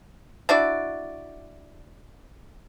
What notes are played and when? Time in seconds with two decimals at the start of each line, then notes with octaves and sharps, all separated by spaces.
0.49 D4 E4 F#4 D5